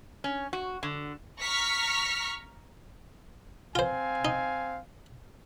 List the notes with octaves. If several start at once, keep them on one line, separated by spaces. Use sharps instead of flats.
C#4
F#4
D3
A#5 C#6 F6 B6
C4 F4 C5 F5 G#5
D#4